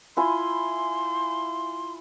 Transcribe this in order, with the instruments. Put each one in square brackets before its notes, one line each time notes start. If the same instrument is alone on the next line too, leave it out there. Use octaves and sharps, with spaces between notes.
[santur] E4 F4 G#5 [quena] C6